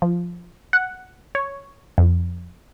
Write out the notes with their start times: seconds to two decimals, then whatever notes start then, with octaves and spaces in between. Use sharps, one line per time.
0.02 F3
0.73 F#5
1.35 C#5
1.98 F2